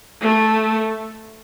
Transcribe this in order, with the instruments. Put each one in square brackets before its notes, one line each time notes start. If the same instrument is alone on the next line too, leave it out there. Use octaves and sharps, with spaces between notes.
[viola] A3